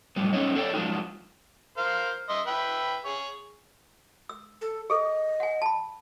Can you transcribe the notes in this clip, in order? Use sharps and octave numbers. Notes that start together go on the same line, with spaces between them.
F2 A2 F#3 G3 B3
A3 B3 C#4 D#4 C#5 D#5
G#4 A4 C#5 D5 G5
F3 G#3 D4 D#4 F4 F#4
A#4 C5 F5
D#5 E5 C6
B4 E5 G5
G#4 C#5
E6
A4
G#4 A4 D#5
F#5 G#5
A5 B5